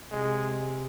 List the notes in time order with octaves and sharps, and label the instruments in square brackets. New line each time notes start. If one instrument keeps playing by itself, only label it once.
[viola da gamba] C3 [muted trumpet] G#3